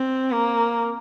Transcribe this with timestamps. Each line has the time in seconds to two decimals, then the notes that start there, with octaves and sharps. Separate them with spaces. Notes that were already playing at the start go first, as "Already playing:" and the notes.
Already playing: C4
0.32 A#3